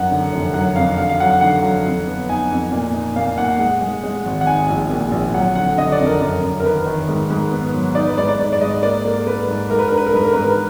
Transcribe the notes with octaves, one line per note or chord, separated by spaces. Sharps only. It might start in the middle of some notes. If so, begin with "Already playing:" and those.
Already playing: F#2 F#5
D3
F1
F#3 F#5
F2 F5
D3 F5
F5
F#3 F#5
F#5
D3 F#5
F#3
F2
B3
D#4 G#5
F2
A#2
D#4
A#2 F5
A#2 F#5
G#3 F#5
G#3
G#3
G#1
F#5
D#4 G#5
A#1
A#2
A#1
F#3 F#5
D3 F#5
D3 D#5
D5
F2
A#4
F#2
F#2
A#4
D#3 B4
D#3
G#2
G#2
B3
F#3
D#4 D5
B4
G#2 D5
D5
G#2 D5
D5
G#2 D#5
A#3 D5
A#3
A#3 B4
G#2
G#2 A#4
B4
D4 A#4
B4
A#4
G#2 B4
A#4
G#2 B4
A#4